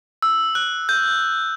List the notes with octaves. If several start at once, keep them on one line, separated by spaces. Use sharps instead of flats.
E6
F#6
G6